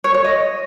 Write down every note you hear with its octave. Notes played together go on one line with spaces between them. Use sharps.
C#5
C#5
D#5